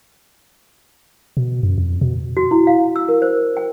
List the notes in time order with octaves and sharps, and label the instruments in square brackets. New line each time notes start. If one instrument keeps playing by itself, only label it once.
[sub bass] B2
F#2
F2
B2
[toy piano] F#4
E4
F5
E6
A#4
C5
G5